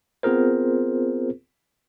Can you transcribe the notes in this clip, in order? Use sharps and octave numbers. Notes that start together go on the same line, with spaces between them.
B3 C4 F4 G#4 A#4 C5